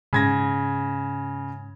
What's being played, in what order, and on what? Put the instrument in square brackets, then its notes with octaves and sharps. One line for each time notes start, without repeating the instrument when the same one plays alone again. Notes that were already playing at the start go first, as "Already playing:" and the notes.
[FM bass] G#2 [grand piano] C#3 G#6 A#6